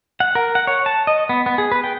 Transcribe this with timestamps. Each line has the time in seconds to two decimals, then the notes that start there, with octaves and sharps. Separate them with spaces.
0.20 F#5
0.35 A#4
0.55 F#5
0.67 C#5
0.86 A5
1.07 D#5
1.29 B3
1.46 B3
1.58 G#4
1.72 B4
1.84 G5